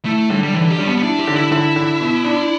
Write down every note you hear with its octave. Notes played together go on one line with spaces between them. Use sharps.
A3 E4
D3 G3
G3
D3 E3
G4
G3 D4
B3
B3
D4 E4
G4
D3
E4
D3 E4
D3
B2
D4